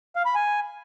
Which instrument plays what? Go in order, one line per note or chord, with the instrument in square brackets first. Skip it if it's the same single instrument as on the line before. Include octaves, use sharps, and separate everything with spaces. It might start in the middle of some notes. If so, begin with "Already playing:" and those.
[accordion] F5
B5
G#5